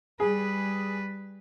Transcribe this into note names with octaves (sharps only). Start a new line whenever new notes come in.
G3 G#4 B4